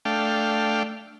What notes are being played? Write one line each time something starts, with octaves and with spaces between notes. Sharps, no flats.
A3 D4 F5 G5